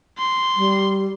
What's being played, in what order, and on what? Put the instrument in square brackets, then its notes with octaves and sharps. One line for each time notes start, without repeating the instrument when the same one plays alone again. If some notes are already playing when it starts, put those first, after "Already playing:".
[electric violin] C6
[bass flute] G3